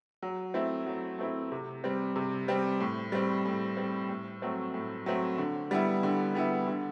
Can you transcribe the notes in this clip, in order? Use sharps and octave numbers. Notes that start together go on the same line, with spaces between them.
F#3
A3 C4 E4
F#3
A3 C4 E4
C3
G3 C4
C3
G3 C4
A2
G3 C4
A2
G3 C4
A2
F#3 A3 C4
A2
F#3 A3 C4
D3
G3 B3 E4
D3
G3 B3 E4
D3